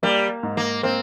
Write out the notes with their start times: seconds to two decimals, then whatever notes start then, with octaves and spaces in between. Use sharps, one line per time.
0.03 G3 A#3
0.43 G#2
0.57 A#3
0.83 A#3 C4